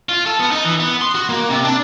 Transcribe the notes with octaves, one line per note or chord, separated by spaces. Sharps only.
F4
A4
B3
D#4
E3
B3
C6
F#4
A#3
C3
D4